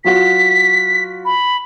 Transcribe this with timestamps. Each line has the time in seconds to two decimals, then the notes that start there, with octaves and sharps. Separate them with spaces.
0.05 F#3 F4 F#4 B6
1.25 B5